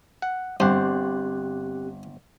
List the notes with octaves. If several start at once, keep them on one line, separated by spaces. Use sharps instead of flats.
F#5
G1 G2 C4 G4 C5 F#6